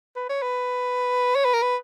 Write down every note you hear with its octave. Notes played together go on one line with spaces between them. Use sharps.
B4
C#5
B4
C#5
B4
A#4
B4